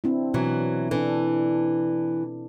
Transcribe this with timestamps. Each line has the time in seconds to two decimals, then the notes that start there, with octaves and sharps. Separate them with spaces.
0.04 C4 D4 E4
0.34 B2 E3 F#3
0.91 E3 D4 A4